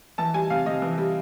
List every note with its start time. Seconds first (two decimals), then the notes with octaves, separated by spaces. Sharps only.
0.18 E3 A5
0.34 G3 G#5
0.50 C3 F5
0.66 C3 D#5
0.82 E3
0.98 G3